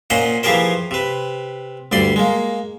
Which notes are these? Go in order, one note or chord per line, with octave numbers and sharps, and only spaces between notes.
A#2 C#4 C5 D#5 F#5
E3 F3 G4 G#4 A#4 C5
C3 B4
D2 G2 D5 C6
G#3 A#3